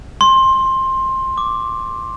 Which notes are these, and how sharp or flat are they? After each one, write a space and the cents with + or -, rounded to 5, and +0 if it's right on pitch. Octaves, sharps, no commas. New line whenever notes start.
C6 +15
D6 -5